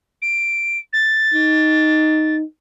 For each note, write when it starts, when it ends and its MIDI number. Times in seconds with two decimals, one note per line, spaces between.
0.22 0.78 98
0.93 2.36 93
1.35 2.43 63